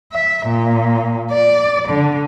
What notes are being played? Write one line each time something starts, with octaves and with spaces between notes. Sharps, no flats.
E5
A#2
D5
D3